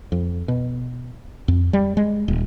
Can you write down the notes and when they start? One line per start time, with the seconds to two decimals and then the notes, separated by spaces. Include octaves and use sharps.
0.12 F2
0.48 B2
1.48 F2
1.73 G3
1.97 G#3
2.28 D#1